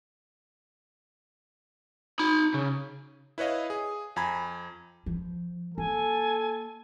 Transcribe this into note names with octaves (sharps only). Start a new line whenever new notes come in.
D#4 B5
C#3
E4 B4 C#5 D#5 F5
G#4
F2 G#5 A#5 B5 G#6
F3
A#3 A4 G#5